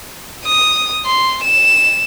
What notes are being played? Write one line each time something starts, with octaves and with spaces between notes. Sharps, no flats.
D#6
C6
E7